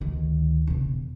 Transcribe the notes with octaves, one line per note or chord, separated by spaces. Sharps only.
D2 D#3
E1 C#3